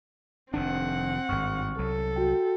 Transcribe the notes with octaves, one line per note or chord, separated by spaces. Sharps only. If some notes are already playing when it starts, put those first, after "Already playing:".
F1 D#3 C4 D4 F#5
G#1 G2 C#6 F6
C2 F#3 A4
F#4 G5